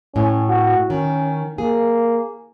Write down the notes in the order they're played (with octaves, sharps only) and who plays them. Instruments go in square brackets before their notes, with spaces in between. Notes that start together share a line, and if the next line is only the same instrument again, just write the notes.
[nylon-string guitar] A2 [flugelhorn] C#4
[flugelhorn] F#4
[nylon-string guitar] D#3 [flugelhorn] C#4
[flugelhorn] A#3 [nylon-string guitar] G#4